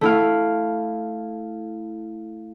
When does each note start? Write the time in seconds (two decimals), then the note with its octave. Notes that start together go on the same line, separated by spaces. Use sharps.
0.01 A3 E4 F5